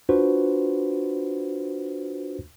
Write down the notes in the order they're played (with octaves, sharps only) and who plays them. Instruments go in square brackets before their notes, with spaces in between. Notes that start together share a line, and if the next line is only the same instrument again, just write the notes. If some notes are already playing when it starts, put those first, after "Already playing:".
[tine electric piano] D4 F4 F#4 B4 C5